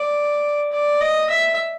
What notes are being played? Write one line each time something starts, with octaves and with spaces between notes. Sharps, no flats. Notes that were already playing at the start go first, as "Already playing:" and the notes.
Already playing: D5
D5
D#5
E5